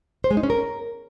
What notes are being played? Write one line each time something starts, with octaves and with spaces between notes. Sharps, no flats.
C5
G#3
D#4
C#4
A#4